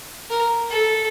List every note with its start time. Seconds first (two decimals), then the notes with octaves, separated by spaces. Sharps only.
0.30 A#4
0.70 A4